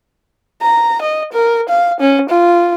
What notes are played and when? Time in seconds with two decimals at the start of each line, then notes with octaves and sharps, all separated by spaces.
0.62 A#5
1.02 D#5
1.33 A#4
1.69 F5
2.00 C#4
2.30 F4